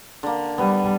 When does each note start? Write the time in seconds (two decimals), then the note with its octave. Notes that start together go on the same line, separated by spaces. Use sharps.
0.23 D3 A#3
0.58 G3 B3